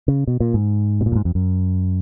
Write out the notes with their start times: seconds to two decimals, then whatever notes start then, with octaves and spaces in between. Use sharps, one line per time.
0.08 C#3
0.27 B2
0.40 A#2
0.54 G#2
1.01 B2
1.06 A#2
1.12 F#2
1.15 G#2
1.25 F2
1.35 F#2